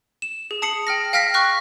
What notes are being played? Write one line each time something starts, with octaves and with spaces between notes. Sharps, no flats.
E7
G#4
A5 D#6 C7 C#7 F#7
G5 F6 A#6
F5 G5 F6 A#6 B6
C#6 F6 F#6 A#6